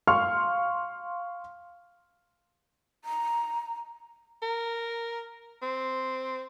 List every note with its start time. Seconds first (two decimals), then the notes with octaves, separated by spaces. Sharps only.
0.07 F5 C6 C#6 F6
3.05 A#5
4.42 A#4
5.62 C4